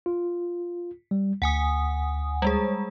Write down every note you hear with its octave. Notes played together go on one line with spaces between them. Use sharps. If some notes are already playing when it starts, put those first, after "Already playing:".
F4
G3
D2 F#5 G#5 D#6
G3 G#3 G#4